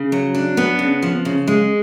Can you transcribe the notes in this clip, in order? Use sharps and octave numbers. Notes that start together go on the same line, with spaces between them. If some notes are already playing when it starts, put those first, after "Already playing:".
Already playing: C#3
F#3
D4
B3
C#3
F3
C#3
G#3